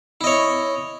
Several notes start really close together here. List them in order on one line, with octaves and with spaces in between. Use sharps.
E4 D#5 C#5